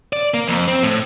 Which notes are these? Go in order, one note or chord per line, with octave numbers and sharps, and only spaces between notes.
D5
A#3
F2
C4
A2